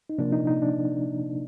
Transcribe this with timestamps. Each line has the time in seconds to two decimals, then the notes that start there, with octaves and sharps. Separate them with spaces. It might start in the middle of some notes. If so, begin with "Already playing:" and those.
0.09 D#4
0.18 C3 F3 A#3 D4
0.32 D#4
0.47 D#4
0.62 D4